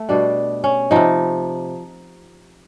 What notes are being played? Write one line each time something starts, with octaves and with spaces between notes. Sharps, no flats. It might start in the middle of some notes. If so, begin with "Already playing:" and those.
Already playing: A3
B2 G3 D4
C#4
C3 F3 D#4